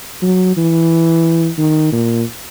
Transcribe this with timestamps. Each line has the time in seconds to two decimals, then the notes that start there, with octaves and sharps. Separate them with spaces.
0.22 F#3
0.57 E3
1.58 D#3
1.92 A#2